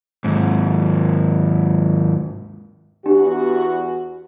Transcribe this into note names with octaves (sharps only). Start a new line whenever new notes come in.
D#2 G#2
E2 D4 F#4 G4